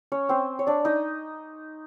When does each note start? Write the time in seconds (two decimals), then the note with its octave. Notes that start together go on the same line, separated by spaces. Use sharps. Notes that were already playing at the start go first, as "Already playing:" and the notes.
0.12 C#4 C#5
0.29 C4 C5
0.59 C#5
0.67 D4 D5
0.85 D#4 D#5